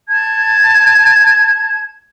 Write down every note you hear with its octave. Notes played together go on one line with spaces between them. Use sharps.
A5 G#6